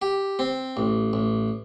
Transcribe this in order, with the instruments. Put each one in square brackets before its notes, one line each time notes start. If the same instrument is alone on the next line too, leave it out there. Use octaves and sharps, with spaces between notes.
[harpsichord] G4
C4
A1
A1